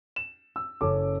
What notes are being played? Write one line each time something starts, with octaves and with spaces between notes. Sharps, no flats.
E7
E6
F#1 C#4 A4 D6